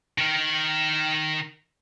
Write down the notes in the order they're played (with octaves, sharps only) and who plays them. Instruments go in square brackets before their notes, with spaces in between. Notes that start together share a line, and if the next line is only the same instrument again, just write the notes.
[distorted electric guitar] D#3 A#4